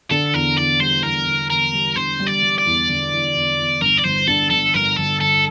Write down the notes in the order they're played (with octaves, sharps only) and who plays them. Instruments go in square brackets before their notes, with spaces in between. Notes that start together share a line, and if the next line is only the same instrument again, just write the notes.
[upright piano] D3 [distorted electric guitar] A4
[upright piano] E2 [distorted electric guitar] A#4
[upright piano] E2 [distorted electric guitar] D5
[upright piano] G3 [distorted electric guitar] C5
[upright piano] E2 [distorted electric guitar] A#4
[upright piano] D3
[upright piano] E2 [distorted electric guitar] A#4
[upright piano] G3
[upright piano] D3 [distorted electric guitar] C5
[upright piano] G3
[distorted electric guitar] D5
[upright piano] G3
[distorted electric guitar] D5
[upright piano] E2
D3
E2
E2
E2
[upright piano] G1 [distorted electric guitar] A#4
[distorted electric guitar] D5
[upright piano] G1 [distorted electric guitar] C5
[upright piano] D3 [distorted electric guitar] A4
[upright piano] G1 [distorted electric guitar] A4
[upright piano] G1 [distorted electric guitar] A#4
[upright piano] G1 [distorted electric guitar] A4
[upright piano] G1 [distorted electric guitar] A4